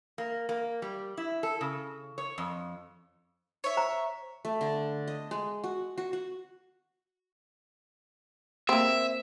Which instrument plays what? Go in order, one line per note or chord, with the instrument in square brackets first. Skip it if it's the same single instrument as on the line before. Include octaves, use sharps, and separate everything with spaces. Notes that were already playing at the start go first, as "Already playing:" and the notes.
[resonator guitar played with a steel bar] A#3
A#3
G3
E4
A4
C#3
C#5
F2
[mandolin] C#5 E5
[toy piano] C5 A#5
[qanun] A3
D3
D#5
G#3
F#4
F#4
F#4
[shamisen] A#3 C4 [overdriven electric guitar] E5